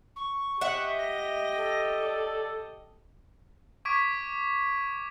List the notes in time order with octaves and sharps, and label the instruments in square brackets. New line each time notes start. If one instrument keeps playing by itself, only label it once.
[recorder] C#6
[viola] G4 D#5 [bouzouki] E5 F#5
[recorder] A#6
[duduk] A4
[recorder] D5
[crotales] C#6 D6 G#6 B6 D7